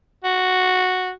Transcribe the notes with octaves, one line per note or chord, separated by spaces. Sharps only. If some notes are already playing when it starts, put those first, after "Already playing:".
F#4